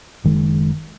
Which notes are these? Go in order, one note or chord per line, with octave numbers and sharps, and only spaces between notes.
F#1 D#3 G#3